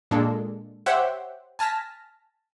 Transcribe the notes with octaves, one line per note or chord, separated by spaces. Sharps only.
A#2 G#3 D4 A4
G4 C5 C#5 E5 F#5 G5
G#5 A5 F6 A#6 B6